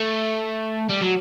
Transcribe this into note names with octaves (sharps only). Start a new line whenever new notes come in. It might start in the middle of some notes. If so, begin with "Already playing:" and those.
Already playing: A3
G3
F#3